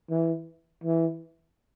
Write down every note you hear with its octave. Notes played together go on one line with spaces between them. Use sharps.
E3
E3